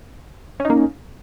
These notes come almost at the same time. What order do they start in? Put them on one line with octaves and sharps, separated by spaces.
C#4 D#4 A#3